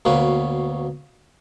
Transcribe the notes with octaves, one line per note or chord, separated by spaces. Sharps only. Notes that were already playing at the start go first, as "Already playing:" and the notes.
D2 B2 A#3 C#4 B4